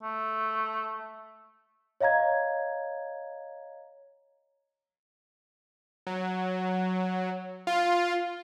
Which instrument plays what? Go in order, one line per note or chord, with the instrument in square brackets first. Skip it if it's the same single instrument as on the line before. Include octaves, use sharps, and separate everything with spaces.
[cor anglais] A3
[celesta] C#5 D#5 F5 A#5 G#6
[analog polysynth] F#3
F4